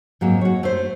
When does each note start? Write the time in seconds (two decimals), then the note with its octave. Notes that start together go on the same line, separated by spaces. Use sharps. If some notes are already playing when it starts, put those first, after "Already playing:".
0.21 G#2 F#3 A#3 C4
0.41 F#4 C#5
0.63 A3 C5